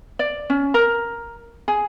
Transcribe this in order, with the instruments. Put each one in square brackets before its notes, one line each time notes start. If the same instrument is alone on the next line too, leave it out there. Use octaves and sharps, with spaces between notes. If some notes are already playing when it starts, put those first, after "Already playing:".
[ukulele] D5
C#4
A#4
G#4